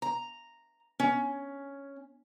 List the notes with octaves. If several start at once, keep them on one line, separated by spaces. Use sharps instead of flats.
A#5
C#4